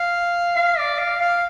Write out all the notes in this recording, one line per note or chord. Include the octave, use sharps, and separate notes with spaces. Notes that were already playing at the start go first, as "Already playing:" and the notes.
Already playing: F5
F5
D5
F5
F5